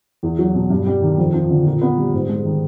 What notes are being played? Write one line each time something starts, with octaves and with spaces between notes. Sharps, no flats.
E2
F#3
B2
G2
G3
D#3
F2
F3
D3
A#2
B3
G3
G#2
G#3
D#3